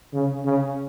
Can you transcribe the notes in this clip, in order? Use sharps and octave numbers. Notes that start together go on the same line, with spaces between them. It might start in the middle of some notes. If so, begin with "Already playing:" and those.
C#3
C#3